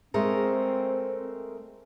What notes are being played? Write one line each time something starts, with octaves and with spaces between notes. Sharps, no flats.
G#3 A3 C4 A#4